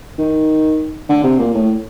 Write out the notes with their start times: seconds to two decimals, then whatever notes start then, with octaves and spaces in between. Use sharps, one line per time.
0.18 D#3
1.09 D3
1.23 C3
1.39 A#2
1.54 A2